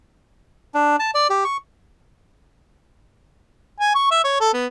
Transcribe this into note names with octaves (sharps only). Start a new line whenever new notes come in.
D4
A5
D5
G4
C#6
G#5
C#6
E5
C#5
A4
B3